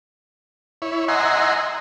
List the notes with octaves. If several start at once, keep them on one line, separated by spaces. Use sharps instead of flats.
E4 C#5
D#5 E5 F#5 G#5 A#5 C6